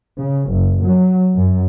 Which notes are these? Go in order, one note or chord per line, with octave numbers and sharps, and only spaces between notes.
C#3
F#1
F#3
F#2